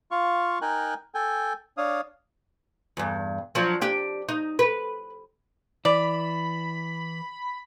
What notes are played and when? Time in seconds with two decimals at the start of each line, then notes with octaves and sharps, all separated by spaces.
0.11 F4 F5 C#6
0.62 D#4 A#4 G5 G#5 F#6
1.15 A4 G5 G#5
1.77 D4 C#5 F5 D#6
2.97 E2 G2
3.55 F3 F#3 D4
3.81 D4 G4
4.29 D#4
4.59 B4
5.85 E3 D5 B5